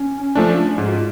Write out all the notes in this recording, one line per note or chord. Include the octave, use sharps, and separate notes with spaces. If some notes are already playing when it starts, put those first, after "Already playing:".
Already playing: C#4
F3 A3 D4
G#2 F4
F#4
F4